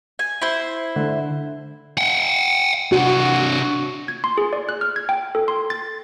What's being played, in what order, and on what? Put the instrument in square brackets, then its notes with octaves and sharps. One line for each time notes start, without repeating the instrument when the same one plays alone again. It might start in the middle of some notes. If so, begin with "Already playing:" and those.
[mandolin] G#5
E4 C5
[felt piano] D3
[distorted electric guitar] F#5 G5
[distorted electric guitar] C3 D4 [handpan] F#4
[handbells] G#6
C6
G#4
D5
F#6
F6
G#6
G5
A4
C6
A6